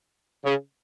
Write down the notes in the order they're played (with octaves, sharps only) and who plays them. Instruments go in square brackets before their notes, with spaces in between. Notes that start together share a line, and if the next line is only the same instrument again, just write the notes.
[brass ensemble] C#3